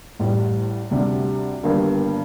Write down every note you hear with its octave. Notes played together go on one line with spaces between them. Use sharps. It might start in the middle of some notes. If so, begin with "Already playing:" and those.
A1 A2 G3
D2 C3 G3 D4
G1 G2 D#3 G3 A#3